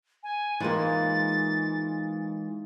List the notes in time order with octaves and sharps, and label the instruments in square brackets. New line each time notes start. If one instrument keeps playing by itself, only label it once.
[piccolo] G#5
[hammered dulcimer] G#2 F4 [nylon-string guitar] E3 G#3 A#3 [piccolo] A6